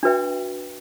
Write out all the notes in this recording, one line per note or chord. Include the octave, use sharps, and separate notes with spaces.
D4 F#4 B4 E5 G5